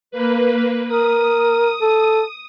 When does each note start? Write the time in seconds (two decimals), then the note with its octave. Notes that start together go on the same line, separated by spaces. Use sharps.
0.11 A#3 B4
0.89 A#4 D#6
1.81 A4